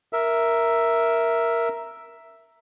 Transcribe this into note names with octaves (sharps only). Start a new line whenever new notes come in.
A#4 E5